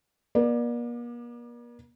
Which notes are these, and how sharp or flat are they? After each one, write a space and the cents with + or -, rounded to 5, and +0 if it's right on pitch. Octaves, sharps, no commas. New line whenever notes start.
A#3 +45 D5 +20